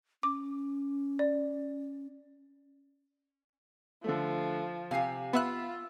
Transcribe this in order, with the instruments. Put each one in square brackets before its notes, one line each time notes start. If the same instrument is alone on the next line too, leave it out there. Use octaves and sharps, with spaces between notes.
[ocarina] C#4 [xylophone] D6
[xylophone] D5
[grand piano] D3 A3 [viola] F3
[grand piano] C3 G#5 C7 [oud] G4 F5
[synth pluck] B3 E5 F#6 [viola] F4 [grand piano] B5 E6